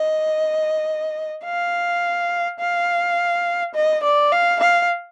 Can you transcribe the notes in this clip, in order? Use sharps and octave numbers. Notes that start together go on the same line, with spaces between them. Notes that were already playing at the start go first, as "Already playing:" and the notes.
Already playing: D#5
F5
F5
D#5
D5
F5
F5